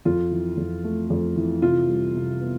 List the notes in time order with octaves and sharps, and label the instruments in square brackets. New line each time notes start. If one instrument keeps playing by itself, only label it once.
[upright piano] F2 F4
E3
F2
A3
F2
E3
C3 F4
G3
C3
B3